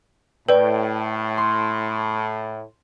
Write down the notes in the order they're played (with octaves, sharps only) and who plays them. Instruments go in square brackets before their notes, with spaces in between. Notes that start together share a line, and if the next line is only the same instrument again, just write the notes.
[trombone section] A2 [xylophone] B4 D5 [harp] G5
[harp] C6